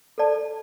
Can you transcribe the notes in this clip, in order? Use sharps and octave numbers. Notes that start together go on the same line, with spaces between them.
A4 D5 A5